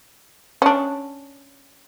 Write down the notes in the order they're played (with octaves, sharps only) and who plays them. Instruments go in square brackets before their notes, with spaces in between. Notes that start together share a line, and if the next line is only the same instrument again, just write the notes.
[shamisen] C#4 D4